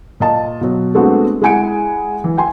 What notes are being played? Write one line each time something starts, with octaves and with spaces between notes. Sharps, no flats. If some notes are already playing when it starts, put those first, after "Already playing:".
A#2 D#5 A5
B2 F#3
G#3 A3 B3 C4 D4 F#4
G#3 E4 F#5 G#5 C#7 D7
E3
G5 G#5 C6